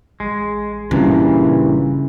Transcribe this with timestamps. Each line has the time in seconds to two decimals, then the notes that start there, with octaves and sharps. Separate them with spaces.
0.20 A1 G#3
0.91 G2 A#2 C#3 E3